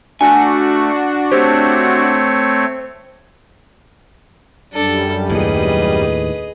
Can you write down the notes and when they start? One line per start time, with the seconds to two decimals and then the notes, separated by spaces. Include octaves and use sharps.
0.21 A3 D4 F#4 G#5 C#6
1.32 A3 C4 G4 C5 C#5
4.73 F#2 G3 D4 A4
5.30 D#2 A2 G#4 B4 D#5